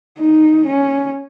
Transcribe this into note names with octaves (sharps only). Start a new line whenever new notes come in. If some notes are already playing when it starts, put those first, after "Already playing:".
D#4
C#4